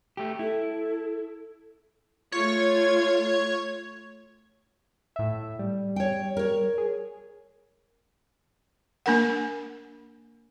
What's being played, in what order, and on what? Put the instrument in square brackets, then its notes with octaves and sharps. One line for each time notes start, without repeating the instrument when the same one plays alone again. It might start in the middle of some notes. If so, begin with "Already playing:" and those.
[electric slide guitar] A3 G4
[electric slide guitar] E4 [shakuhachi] A4
[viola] A3 F4 [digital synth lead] C#5
[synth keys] A2 E5
G3
[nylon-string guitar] C#5 G5
A#4 C#5
[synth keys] G#4
[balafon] A#3 D4 A#4 F#5